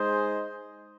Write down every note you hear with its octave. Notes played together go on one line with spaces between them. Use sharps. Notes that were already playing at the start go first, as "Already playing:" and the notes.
Already playing: G#3 D#4 G#4 C5 D#5